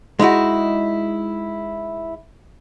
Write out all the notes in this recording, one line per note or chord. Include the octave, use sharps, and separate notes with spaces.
G#3 D#4 E4 F#4